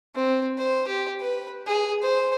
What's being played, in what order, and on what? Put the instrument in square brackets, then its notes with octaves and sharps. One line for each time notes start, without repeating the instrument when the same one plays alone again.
[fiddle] C4
C5
G4
B4
G#4
C5